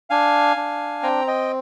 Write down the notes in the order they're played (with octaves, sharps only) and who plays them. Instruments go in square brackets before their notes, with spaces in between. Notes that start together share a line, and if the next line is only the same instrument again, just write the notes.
[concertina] D4 F5 G#5
D4
C4 G5 A#5
D#5 G5